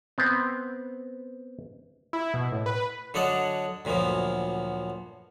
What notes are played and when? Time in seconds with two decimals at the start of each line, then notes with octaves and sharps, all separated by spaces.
0.18 B3 C4
2.13 E4
2.34 B2
2.52 A2
2.66 B4
3.14 D3 F#3 D4 D#5 F#5 A5
3.85 D2 A#2 F3 F#3 B3